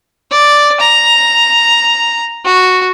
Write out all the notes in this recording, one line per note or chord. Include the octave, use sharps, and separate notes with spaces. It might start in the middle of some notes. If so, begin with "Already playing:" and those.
D5
A#5
F#4